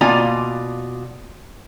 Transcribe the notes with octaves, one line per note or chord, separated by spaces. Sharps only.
B2 A#3 F4 D5 G#5 A#5